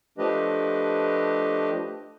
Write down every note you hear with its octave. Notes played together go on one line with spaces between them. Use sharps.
F3 A3 D4 G4 B4 D#5